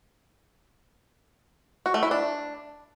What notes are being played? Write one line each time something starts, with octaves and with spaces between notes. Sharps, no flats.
F#4
A3
E4
D4